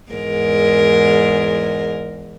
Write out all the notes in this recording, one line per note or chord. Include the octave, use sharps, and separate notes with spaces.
E2 G#2 A#4